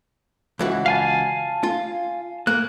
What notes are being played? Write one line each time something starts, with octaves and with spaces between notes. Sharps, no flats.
C#2 E3 F#4
F5 G#5 A5
F4
A#3 F#6